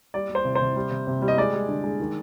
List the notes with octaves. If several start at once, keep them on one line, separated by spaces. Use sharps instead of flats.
G3 D5
G3
C5
C3
C5
C3
G3
C3
C3
G3
D#5
G#3 D5
G#3
D3
G#3
D#3